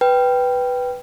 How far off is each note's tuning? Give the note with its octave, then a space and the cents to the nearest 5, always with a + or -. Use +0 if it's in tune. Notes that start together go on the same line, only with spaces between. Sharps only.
B4 +0 G5 +0